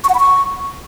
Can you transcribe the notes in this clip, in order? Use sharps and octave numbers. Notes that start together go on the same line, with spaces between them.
C#6
F#5
B5
C#6